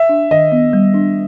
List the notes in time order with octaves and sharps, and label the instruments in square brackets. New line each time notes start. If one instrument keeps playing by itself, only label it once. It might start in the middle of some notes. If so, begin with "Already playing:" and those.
Already playing: [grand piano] E5
[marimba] D4
[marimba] D#3 [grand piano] D#5
[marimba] B3
G3
D4